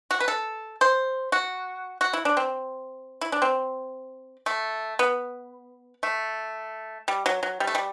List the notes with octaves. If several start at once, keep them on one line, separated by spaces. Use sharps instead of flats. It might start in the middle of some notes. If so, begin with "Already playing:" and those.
F#4
B4
A4
C5
F#4
F#4
E4
D4
C4
E4
D4
C4
A3
B3
A3
G3
F#3
F#3
G3
A3
G3